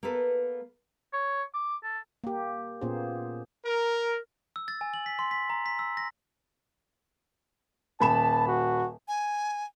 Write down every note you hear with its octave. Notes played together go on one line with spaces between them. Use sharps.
A#3 B3 A4 B4
C#5
D6
A4
A#3 G4
A#2 A#3 B3 C#4 G#4 C5
A#4
E6
A6
G#5
F#7
B6
C6
B6
A#5
B6
E6
A#6
D#1 A5 B5 E7
F#4
G#5